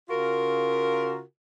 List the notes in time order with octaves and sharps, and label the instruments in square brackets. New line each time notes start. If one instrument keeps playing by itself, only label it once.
[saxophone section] C#3 F4 F#4 A#4